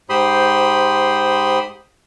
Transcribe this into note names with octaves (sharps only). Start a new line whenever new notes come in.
G#2 G4 C5 B5 C6 D#6